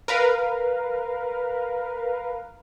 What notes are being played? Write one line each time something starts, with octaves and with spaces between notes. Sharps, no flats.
A#4 B4 F5